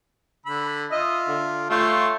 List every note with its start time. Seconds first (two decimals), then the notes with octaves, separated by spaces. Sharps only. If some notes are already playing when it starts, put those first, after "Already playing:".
0.46 D3 B5 E6
0.91 F4 D#5 E5
1.28 D3
1.71 A3 F4 C#5 G5 C6